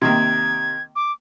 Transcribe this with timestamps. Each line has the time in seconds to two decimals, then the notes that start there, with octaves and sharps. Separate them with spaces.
0.02 C3 D#3 A#3 G#6
0.96 D6